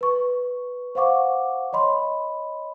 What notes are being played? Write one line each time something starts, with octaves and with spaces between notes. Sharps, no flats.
B4 C#6
C5 F5 F#5 C#6 D6
C#5 D#5 B5 C6